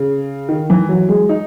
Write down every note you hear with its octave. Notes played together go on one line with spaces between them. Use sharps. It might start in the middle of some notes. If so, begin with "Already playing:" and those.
Already playing: C#3
D#3
E3
F#3
G#3
D#4